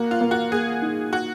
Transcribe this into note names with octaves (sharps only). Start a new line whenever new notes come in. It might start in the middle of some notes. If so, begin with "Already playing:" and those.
Already playing: A#3 F#4
F4
A#3
F#4
A#3 G#4
D#4
F#4